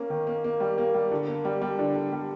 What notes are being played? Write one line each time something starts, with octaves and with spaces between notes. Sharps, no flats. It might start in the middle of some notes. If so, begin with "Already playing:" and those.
Already playing: A#3 C#4
D#3
A#3
A#3
G3
A#3
G3
D3
A#3
G3
G3
D3
D3
G3